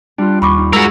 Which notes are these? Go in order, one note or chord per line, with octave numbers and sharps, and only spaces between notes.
G3 D4 F4
D#2 B5 C#6 D6
D#4
G#3 F#4 G#4 A#4 B5 E6 A6